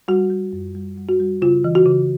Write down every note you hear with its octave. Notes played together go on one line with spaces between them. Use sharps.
G3 F#4
G3
F#2
G3
G3
F#4
G3
C#3 F4
E3
F#4
C#3